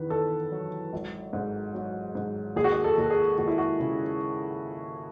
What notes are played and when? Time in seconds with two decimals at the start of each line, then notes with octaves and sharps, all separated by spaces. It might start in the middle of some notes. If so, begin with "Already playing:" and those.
Already playing: E2 D#3 B4
0.10 D#3 A4
0.52 F#3
0.93 G#1
1.33 G#2
1.74 F#3
2.15 G#2
2.56 D#2 G#4
2.64 F#4
2.72 G#4
2.84 A4
2.98 D#2 A4
3.10 G#4
3.38 D#2 F#4
3.48 E4
3.58 F#4
3.80 C#3